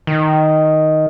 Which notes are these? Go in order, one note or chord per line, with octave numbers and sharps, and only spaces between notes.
D#3